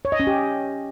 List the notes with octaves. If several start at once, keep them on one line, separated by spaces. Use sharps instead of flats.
C#5
D#5
C#4
G4